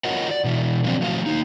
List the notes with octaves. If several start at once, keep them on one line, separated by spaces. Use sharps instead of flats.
F4 F#4 A#4 C#5 D#5 F#5
D5
B2 E3
D3 F3 F#3 B3 C4 D4
F3 A3 F#4 F5
A#3 D#4